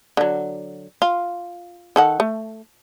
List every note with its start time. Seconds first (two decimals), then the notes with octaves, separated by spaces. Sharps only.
0.17 D3 F#3
1.02 F4
1.96 D#3 A4 F#5
2.20 A3